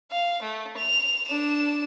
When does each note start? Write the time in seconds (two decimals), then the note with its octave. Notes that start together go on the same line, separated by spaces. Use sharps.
0.11 F5
0.42 A3
0.77 F7
1.27 D4 E7